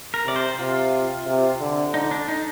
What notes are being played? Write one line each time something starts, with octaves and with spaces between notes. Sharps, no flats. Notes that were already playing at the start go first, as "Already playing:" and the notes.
A#4
C3 D5
C5
C3 F4
C3
D3
D3 D#4
D4
D#4